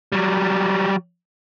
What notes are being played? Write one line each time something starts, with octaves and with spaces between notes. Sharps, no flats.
F#3 G3